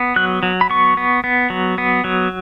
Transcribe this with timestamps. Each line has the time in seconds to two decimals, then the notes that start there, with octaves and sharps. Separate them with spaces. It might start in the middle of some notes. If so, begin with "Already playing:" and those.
Already playing: B3
0.16 F#3 F#6
0.43 F#3
0.61 B5
0.70 B3 C#6
0.97 B3
1.24 B3
1.50 F#3
1.78 B3
2.04 F#3